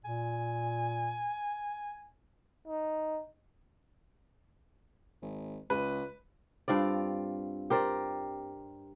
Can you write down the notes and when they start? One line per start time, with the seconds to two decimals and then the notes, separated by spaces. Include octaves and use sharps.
0.05 A#2 G#5
2.67 D#4
5.22 G#1
5.70 C#2 B4
6.68 G2 C4 F4 D5
7.70 G4 A#4 C5 D5